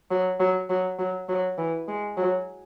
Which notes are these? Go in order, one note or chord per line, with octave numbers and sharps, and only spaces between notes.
F#3
F#3
F#3
F#3
F#3
E3
G#3
F#3